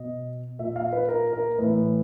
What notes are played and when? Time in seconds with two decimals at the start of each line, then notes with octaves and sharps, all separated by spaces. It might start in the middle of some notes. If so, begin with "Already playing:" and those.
Already playing: B2 D#5
0.59 A#2 E5
0.76 F5
0.93 B4
1.09 A#4
1.33 A#4
1.58 A2 E3 B4